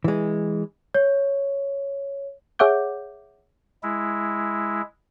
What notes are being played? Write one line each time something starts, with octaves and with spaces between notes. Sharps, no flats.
E3 G#3
C#5
G#4 C#5 E5 F#5 D6 G6
G#3 E4